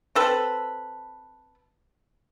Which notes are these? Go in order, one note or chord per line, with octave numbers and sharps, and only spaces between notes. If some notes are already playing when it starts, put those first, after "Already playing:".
C4 A4 B4